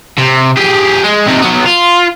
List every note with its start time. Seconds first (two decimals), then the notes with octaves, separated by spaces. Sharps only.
0.18 C3
0.57 G4 G#4
1.04 G#3
1.27 C3 D#4
1.41 F#3 B3
1.65 F4